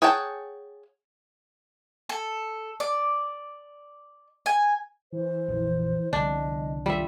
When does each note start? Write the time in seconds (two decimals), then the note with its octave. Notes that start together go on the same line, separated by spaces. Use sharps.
0.02 G#4 C#5 F#5 G5 A5
2.09 A4
2.80 D5
4.46 G#5
5.13 E3 C5
5.48 A#1 F2 F3
6.13 C2 D3 F3 B3 D4 D#5
6.86 F#2 D#3 F#3 G3 F4 E5